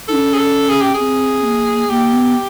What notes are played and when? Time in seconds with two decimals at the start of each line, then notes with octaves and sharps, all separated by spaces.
0.08 D#4 A4
0.13 C#4
0.33 G#4
0.38 A4
0.69 G#4
0.82 G4
0.94 G#4
1.00 C4
1.44 A#3
1.90 A#3 G4
2.13 B3